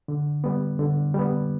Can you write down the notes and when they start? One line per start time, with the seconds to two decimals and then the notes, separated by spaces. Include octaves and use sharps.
0.08 D3
0.44 G3 B3
0.79 D3
1.14 G3 B3